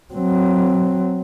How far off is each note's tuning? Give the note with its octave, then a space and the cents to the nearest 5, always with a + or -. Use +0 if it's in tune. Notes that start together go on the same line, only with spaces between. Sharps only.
F#3 +0 C4 +0